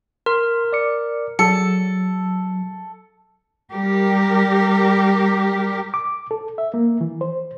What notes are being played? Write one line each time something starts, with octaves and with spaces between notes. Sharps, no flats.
A#4 C6
D5 D6 C#7
F#3 A4 C#7
G3 G4 A#4
D6
A4
E5
A#3
E3
C5